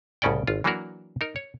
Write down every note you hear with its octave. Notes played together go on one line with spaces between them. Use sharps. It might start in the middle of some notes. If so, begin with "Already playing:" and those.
C2 A2 C#3 C#4 D5 G5
G#1 F4
E3 F#3 A#3 D4 F#4 A#4
D#4 A#4
C#5